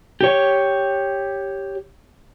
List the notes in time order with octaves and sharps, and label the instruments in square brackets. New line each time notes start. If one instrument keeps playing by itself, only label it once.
[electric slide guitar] G4 C#5